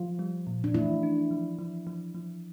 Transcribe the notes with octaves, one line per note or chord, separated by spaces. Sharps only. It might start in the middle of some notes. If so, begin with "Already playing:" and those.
Already playing: F3 F4
G3
A#2
D4
E3 A3 E4
D4
F3
F3
F3
F3